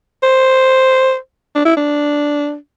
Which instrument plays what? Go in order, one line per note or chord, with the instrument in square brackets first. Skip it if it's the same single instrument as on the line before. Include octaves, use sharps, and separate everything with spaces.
[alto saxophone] C5
D4
E4
D4